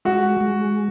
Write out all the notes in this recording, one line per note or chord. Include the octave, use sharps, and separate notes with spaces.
G#3 F#4
G#3